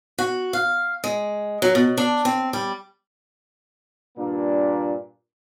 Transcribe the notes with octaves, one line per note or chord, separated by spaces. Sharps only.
F#4
F5
G#3
F#3
B2
D4
C4
G3
G2 A#2 A#3 D4